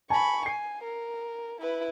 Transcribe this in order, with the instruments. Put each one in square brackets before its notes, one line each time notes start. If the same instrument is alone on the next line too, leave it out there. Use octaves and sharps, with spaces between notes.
[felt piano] G#5 A5 [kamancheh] B5 C#6
[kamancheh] G#5 [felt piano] C7
[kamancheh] A#4
E4 B4